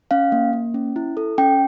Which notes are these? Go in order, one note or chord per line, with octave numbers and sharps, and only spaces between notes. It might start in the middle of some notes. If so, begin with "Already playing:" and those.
C#4 F5
A#3
A#3
C#4
E4
A4
C#4 G5